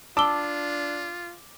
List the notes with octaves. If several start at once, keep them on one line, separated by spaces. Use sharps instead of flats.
D4 F4 A5 D6 E6 G7